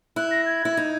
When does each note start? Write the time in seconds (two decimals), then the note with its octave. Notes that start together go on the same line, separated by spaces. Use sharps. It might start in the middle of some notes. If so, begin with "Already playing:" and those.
0.16 E4 F#6
0.31 A#6
0.46 G#6
0.65 E4
0.77 D#4